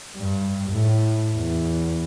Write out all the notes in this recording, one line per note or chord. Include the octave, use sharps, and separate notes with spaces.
G2
A2
E2